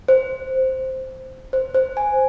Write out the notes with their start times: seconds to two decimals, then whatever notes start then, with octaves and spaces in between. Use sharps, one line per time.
0.08 C5
1.53 C5
1.74 C5
1.97 G#5